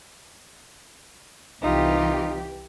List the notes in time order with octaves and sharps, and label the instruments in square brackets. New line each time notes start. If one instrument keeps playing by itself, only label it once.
[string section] C2 E3 G4 [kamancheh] D#4 F4